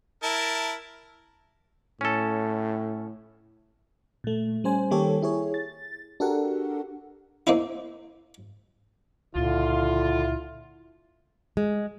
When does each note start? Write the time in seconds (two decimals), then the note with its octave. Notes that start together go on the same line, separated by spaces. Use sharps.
0.23 E4 A#4 A5
2.01 A2 C#4 A4
4.24 A#2 A3
4.64 G3 C#4 C5 G#5
4.91 D#3 G3 A#3 G4 A4 C#5
5.22 E4 G#4 C#5
5.54 A6
6.20 D4 F#4 G4 A4 A#4 F#5
7.47 A#3 C4 D#4 E4
9.35 C#2 A#2 D3 E4 F4
11.57 G#3